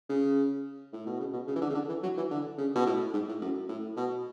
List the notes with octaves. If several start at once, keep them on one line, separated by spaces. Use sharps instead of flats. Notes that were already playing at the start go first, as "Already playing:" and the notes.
C#3
A2
B2
C#3
B2
C#3
E3
D3
C#3
D3
E3
F#3
E3
D3
C#3
B2
A2
G#2
A2
F#2
A2
B2